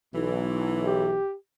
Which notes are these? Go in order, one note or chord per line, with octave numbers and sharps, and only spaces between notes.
B1 E3
G4